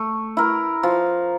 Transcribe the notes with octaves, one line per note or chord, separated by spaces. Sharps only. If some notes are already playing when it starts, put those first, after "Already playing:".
Already playing: A3
E4 A#4
F3